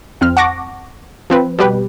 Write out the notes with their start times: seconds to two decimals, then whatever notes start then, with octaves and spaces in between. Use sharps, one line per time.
0.21 F2 C4 F6
0.37 F#5 A5 C#6 D6 A#6
1.30 F3 C4 B4
1.59 B2 G3 G4 B4